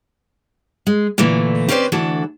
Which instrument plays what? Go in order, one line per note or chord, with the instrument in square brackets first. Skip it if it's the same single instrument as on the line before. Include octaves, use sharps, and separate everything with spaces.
[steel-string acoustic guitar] G#3
A#2 D3 E3 A3
C4 C#4 G4 B4 C5 D5
D2 E3 D4 F#4 A4